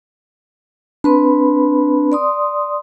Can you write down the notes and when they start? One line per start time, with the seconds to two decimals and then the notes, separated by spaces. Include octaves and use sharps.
1.04 C4 D4 B4 B5
2.12 D5 C6 D#6